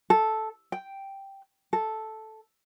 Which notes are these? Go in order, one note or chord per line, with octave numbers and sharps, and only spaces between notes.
A4
G5
A4